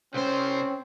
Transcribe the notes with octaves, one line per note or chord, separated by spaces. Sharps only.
C2 C4 C#4 C5